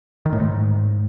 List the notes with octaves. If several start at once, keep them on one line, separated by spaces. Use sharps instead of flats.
D#3
A2
G#2